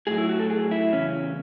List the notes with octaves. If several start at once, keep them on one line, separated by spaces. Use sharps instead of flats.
A2 F#3 G#4
E4
F#4
A4
G#4
E4
E2 C#3 C#4